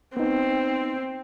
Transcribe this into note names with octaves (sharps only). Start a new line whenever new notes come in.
B3 C4 D#4